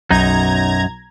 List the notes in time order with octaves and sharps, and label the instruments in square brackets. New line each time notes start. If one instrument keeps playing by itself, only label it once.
[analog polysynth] B1 A#5 G#6 [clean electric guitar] F#2 D#4